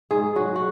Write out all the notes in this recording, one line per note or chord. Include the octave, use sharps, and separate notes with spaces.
G#2 G#4
F#3 F#4
F#4